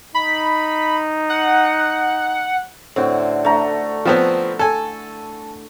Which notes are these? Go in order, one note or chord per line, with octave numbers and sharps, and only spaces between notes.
D#4 B5
F#5
A2 D3 C4 F#4
A3 D4 A#5
F3 B3 C4
A4 G#5